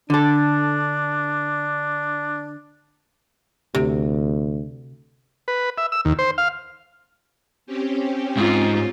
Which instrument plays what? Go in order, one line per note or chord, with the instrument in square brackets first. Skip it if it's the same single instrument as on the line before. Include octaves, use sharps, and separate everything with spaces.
[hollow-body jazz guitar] D3 A4 [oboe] D4
[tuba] D2 [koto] C3
[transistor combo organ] B4
E5
E6
D#2
C5
F5
[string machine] C4 C#4 G4
[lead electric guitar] G#2 [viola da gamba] F4